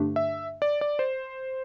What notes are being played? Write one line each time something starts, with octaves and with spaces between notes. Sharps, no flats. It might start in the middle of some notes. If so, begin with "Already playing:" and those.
Already playing: G2 D3 A3 D4 G4
E5
D5
D5
C5